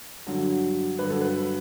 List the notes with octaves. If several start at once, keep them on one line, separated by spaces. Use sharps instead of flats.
G2 D3 F#3
G2 D3 F#3 B4
A4
B4